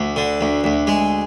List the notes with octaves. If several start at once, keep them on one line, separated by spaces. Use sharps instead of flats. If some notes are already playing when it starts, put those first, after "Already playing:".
Already playing: D2
D3
D2
D2
G#3